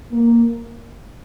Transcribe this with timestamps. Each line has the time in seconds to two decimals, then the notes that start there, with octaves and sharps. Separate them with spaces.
0.11 A#3